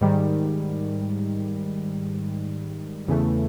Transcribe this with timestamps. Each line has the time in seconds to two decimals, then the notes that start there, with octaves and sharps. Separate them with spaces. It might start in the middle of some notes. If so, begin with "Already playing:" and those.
0.01 G#2 D#3 G3
3.08 E2 C#3 E3 A3